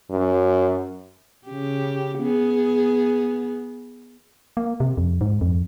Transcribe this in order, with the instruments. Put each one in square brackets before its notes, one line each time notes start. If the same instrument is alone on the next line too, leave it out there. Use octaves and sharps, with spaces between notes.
[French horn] F#2
[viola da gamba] C#3 G4
B3 G#4
[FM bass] A#3
C3
F2
G#2
F2